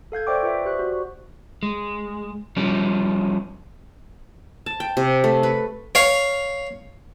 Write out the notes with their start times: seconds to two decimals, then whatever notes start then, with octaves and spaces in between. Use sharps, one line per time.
0.12 A4 F5 G6 G#6
0.27 C5 D5 E5 G5 C#6 D6
0.43 F4 B4 E5
0.65 G4 C5 D5 C#6 F#6
0.79 F#4 C#6
1.63 G#3
2.56 F3 G3 C#4
4.66 A5
4.80 G5
4.97 C3
5.24 A3
5.43 B4
5.95 C#5 F5